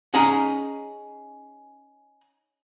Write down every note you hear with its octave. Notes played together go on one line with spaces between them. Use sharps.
C#4 D#4 G#4 G#5 A#5